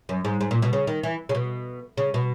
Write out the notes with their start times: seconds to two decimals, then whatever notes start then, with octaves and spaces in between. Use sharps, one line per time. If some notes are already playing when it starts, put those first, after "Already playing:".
0.09 F#2
0.25 G#2
0.41 G#2
0.51 A#2
0.62 B2
0.73 C#3
0.87 D#3
1.03 E3
1.29 C#3
1.35 B2
1.97 C#3
2.14 B2